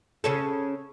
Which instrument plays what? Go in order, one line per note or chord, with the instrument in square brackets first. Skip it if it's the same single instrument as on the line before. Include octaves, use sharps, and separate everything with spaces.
[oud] C#3 C#4 A4